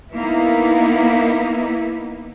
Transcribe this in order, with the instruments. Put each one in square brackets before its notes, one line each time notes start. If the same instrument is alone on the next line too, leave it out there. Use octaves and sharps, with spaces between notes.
[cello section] A#3 B3 D#4 E4